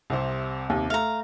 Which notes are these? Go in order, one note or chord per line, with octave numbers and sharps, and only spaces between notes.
C2 C3 C5
D#2 C3
A3 F5 A#5